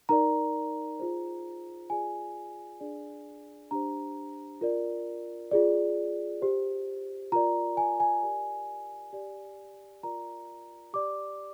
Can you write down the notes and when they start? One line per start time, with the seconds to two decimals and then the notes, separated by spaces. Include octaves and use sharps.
0.09 D#4 A#4 D5 A#5
0.99 F4 G#4 C5
1.90 F4 G#4 D5 G#5
2.80 D4 G#4 D5
3.71 D4 G4 C5 A#5
4.61 F4 A#4 D5
5.51 F4 G#4 D5
6.42 G4 C5
7.32 F4 A#4 D5 A#5
7.77 G#5
8.00 G#5
8.23 G4 A#4 D5
9.13 G4 D5
10.03 F4 A#4 D5 A#5
10.93 G4 D5 D6